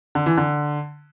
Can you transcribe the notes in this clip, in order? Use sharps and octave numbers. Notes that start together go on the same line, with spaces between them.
D3
E3
D3